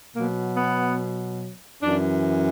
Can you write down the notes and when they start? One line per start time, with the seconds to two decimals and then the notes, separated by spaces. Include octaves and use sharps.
0.14 B2 F#3 A#3
0.56 B3
1.83 F#2 E3 D4